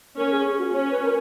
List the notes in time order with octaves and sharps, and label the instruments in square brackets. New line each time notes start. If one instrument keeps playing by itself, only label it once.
[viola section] C#4 [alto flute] A#4
[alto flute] G#4
G#4
F#4
[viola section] C#4 [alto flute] C#5
[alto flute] B4
A#4